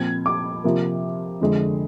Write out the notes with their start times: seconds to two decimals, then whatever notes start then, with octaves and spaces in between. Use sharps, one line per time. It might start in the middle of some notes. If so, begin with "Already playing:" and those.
Already playing: A#2 F3 C4 G#6
0.26 D6
0.64 C3 F3 A#3
1.41 F2 D3 G#3